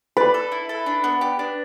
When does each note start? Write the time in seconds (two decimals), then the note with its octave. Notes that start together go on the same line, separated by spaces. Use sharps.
0.17 B4 D5
0.34 A4
0.52 E4
0.69 A4
0.86 D4
1.04 B3
1.21 G4
1.39 D4